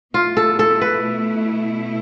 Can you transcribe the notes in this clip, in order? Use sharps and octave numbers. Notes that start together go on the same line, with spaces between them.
B2 A3 E4 F4
A4
A4
B4